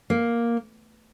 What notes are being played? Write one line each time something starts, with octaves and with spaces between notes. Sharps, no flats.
A#3